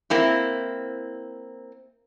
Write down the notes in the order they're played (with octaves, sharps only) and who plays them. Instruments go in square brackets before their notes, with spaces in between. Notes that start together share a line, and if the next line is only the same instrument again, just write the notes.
[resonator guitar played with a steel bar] A#3 C4 E4